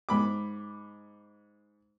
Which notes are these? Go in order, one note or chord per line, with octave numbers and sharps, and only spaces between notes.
G#2 B5 D6